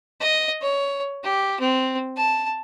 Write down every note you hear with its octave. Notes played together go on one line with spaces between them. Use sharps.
D#5
C#5
G4
C4
A5